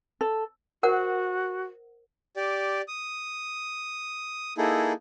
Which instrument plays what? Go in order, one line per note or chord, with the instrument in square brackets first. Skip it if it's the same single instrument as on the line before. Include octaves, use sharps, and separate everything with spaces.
[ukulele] A4
[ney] F#4 [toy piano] A#4 C5 F#5
[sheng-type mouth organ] G4 D5
D#6
A#3 D#4 E4 G#4 A4